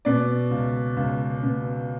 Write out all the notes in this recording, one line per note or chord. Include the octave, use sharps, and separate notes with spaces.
B2 D5
C#2
C#2
B2